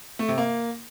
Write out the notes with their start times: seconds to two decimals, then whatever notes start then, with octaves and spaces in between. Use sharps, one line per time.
0.19 A3
0.28 C3
0.38 A#3